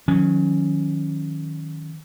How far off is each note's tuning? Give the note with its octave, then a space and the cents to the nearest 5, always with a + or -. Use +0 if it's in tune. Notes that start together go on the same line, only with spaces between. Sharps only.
D#3 +0 F#3 -30 C#4 +0